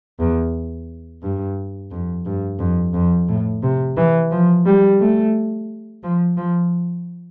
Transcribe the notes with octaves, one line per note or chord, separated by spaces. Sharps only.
E2
G2
F2
G2
F2
F2
A2
C3
E3
F3
G3
A3
F3
F3